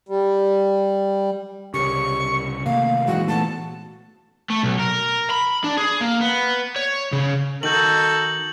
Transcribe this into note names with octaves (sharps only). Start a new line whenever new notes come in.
G3
C2 C#3 G4 A#4 C#5 C#6
C3 D#3 A3 A#3 F5
F#2 A#2 E3 G#3 D#4 F#4
A3 B3 F#4 A5
A3
B1
A#4
B5
D4
G#4
A#3
B3
C#5
C#3
D#3 D#4 F#4 A4 G6 F#7